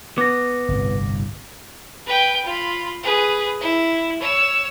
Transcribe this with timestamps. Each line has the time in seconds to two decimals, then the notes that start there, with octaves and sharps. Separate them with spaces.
0.18 B3 D6 A#6
0.68 G1 C2 A2
2.06 B4 G5
2.45 F4 B5
3.03 G#4 B4
3.60 E4
4.20 C#5 E6